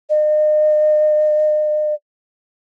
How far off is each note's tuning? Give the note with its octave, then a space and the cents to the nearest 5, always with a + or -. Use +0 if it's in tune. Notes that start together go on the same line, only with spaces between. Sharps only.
D#5 -40